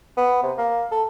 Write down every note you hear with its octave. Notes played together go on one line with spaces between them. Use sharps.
B3
C3
A#3
A4